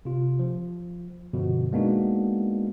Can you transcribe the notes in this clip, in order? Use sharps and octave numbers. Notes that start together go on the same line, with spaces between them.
C3 F4
F3
G2 B2 D3 F3
G#3 A#3 B3 D4 D#4 F#4